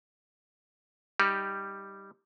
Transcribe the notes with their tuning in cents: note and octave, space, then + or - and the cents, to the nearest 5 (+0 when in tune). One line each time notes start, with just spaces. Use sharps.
G3 +0 D#4 +10 G4 +0